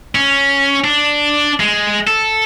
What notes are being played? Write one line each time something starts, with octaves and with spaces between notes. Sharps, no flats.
C#4
D4
G#3
A4